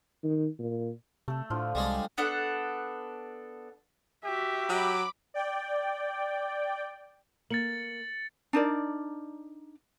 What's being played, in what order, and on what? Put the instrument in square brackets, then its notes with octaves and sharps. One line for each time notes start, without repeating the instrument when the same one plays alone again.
[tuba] D#3
A#2
[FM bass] C3 [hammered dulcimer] A3 A4
[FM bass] A2 [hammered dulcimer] D3 F3 F4
[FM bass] C2 [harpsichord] G3 G#3 D5
[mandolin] B3 D4 A4 F#5
[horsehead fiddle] F#4 E5 [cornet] G4
[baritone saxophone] F#3 [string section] B5 D6
[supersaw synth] D5 G5
[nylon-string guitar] A#3 [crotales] A6 C#7 F#7
[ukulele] D4 D#4 A#4 D5